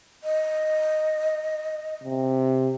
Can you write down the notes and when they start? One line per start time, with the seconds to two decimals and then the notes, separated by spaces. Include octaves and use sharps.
0.24 D#5
2.04 C3